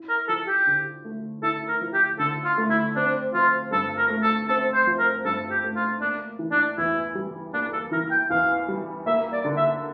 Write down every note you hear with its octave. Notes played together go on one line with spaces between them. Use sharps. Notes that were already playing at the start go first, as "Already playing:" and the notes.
Already playing: E4
A#4
F3 A4
G4
D3
A3
E4 A4
A#4
F3
G4
D3 A4
F4
A3
E4
C4 D4
F3 F4
G2 A4
A#4
A3
A4
C4 A4
C5
F3
A#4
G2 A4
G4
A3
F4
A#3 D4
E3
D4
E2 E4
G3
A#3 D4
A4
E3 A#4
G5
E2 F5
G3
A#3 E5
D5
D3
E5